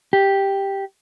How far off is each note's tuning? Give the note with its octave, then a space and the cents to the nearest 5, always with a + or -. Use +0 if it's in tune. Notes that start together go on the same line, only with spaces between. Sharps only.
G4 +0